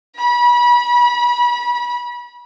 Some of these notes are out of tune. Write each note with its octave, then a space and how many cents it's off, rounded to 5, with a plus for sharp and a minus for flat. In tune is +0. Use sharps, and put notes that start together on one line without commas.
B5 -30